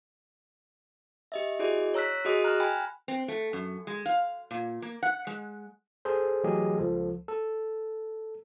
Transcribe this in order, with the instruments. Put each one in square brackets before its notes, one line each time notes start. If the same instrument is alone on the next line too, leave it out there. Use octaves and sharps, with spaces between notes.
[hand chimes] G4 D#5 E5
E4 F#4 G#4 D5 D#5
C#5 A#5 E6 F#6 B6
F#4 G#4 D#5 D#6
A#5 F6 F#6
G5 G#5 B5
[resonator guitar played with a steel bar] C4
A3
F#2
G#3
F5
A#2
A#3
F#5
G#3
[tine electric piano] G#4 A4 C5
E3 F#3 A3 G4 G#4 D#5
C#2 F3 A4
A4